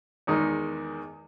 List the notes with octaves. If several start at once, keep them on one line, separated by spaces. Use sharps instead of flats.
E2 D#3 G#3 D#4